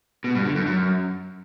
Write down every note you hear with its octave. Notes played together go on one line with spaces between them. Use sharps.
B2
G2
D3
F#2
F#2